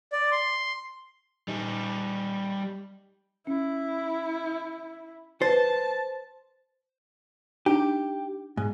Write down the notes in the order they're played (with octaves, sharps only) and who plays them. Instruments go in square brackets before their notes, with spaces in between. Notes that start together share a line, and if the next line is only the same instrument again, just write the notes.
[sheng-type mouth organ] D5
C6
[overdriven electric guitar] G3 D#4
[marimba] C#4 [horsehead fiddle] E4
[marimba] B4 A6 [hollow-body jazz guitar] C5 [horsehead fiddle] A5
[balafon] D4 D#4 [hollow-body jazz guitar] G4
[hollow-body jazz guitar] G#2